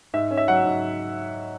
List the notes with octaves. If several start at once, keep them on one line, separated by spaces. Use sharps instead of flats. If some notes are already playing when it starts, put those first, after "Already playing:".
G#2 E5
C#4
E5
F#3 F#5
G#2